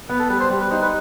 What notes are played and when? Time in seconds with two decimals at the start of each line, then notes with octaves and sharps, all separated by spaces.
0.09 B3 B4
0.19 A4
0.29 G3 B4
0.40 C5
0.50 G3
0.60 B4
0.71 D#4 C5
0.81 B4